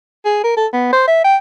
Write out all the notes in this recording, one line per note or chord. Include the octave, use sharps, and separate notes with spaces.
G#4
A#4
A4
B3
C5
E5
G5